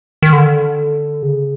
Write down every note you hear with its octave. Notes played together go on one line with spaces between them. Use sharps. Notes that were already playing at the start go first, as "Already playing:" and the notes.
D#3
D3
C#3